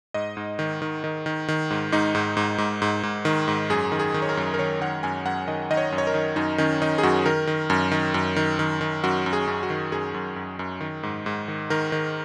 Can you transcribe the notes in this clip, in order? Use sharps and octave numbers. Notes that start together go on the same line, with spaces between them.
G#2 D#5
G#2
D#3
D#3
D#3
D#3
D#3
G#2
G#2 D#4
G#2
G#2
G#2
G#2
G#2
D#3
G#2
F#2 G#4
D#3
G#4
D#3
C#5
A#4
F#2
A#4
D#3 C#5
D#3 F#5
F#2 G#5
F#2 F#5
D#3 D#5
D#3 D#5
C#5
F#2
C#5
A#4
D#3
F#2 D#4
D#3 C#4
D#3 D#4
G#4
F#2 F#4
D#3 A#4
D#3
F#2
D#3
F#2
D#3
D#3
D#3
F#2 F#4
F#2
G#4
F#2
F#4
D#3
F#2 G#4
F#2
F#2
F#2
D#3
G#2
G#2
D#3
D#3 A#4
D#3